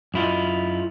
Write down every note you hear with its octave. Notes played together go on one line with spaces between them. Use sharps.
F#2 E4 F4 D#5